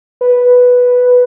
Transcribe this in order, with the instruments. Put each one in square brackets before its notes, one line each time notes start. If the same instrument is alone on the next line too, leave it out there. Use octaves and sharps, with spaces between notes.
[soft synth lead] B4